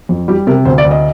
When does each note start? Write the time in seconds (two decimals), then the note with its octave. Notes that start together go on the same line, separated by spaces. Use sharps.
0.09 F2
0.28 G3 G4
0.47 C3 A#4
0.65 D2 C5
0.78 D5
0.85 D2
0.91 D#5